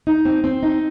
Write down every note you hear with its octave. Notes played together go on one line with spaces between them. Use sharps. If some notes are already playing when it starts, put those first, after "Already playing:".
D#4
C4
C4
D#4